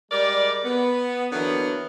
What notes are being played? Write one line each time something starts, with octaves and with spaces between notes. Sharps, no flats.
G3 G#3 A#4 D5
B3
D3 E3 F#3 A#3 B3